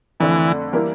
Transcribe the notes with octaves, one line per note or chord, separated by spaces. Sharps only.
F2 D3 E3 A3
E3 G3 A#3 E4 A#4